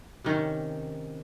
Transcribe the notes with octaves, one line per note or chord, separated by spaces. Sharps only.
C3 D#3 C#4